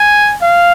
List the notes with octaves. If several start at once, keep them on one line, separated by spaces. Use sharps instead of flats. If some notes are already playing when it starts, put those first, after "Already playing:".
Already playing: G#5
F5